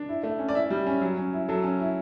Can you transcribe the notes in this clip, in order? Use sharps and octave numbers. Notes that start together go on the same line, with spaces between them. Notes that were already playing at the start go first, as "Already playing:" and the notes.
Already playing: D4
E4
A3
C#4
D5
E4 E5
G3
C#4
F#3
C#4
E4
F#3 A4
C#4
E4